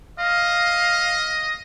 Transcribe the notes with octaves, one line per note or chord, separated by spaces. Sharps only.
D#5 F5